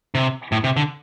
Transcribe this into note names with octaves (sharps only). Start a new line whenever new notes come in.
C3
A2
C3
D3